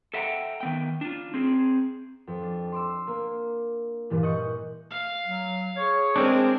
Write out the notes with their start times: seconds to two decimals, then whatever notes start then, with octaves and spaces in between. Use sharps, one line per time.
0.14 A4 E5 F#5 G5 A#5
0.60 D#3 B3 G5
1.01 D4 F4
1.34 C4 G#4
2.27 F2
2.42 D4
2.72 C6 D6 E6
3.07 A#3
4.10 G2 A#2 E3
4.23 D#5 C#6 F#6 G6 C#7
4.90 F5
5.26 F#3
5.77 G#4 C#5
6.16 G#3 C4 D4 A#4